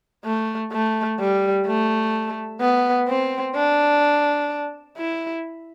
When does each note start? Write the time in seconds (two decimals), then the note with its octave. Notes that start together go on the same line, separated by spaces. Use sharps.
0.25 A3
0.72 A3
1.19 G3
1.67 A3
2.61 B3
3.09 C4
3.55 D4
4.98 E4